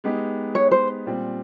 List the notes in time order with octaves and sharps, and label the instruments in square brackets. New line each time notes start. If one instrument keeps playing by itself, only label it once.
[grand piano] G#3 B3 D#4 G4
[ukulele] C#5
C5
[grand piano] A#2 G3 C4 F4